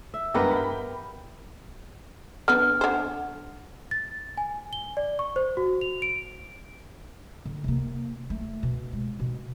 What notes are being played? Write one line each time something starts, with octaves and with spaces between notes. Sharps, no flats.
E5
G2 G#3 B3 G4 A#4 B4
G5 B5
B3 D4 B4 F6
D3 C5
A6
G#5
G7
D5
C#6
C5
F#4
F7
D7
D3
C3 A#3
A3
B2
G#3
B2